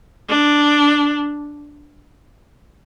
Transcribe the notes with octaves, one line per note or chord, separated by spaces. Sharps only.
D4